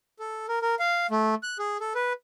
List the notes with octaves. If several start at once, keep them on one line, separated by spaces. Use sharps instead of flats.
A4
A#4
A#4
F5
A3
F#6
G#4
A4
B4